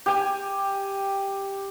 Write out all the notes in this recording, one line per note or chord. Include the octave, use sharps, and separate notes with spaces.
G4 G#5